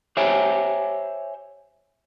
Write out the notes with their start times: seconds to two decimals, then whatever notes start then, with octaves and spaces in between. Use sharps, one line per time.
0.17 G4 C5 C#5 E5 G5 G#5